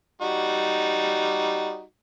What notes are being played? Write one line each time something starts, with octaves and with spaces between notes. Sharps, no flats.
G3 D#4 F#4